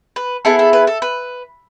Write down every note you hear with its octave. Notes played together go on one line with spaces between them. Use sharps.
B4
B3 E4 G#4 A4
A4
B4
A4
B4